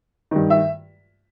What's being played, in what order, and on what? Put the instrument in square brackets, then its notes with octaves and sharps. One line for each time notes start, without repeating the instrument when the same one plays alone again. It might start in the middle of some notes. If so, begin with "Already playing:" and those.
[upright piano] G2 D#3
E5